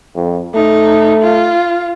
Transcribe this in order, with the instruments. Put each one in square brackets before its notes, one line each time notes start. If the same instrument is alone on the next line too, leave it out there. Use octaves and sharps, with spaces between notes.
[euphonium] F2
[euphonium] A3 [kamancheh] D#4
[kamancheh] F4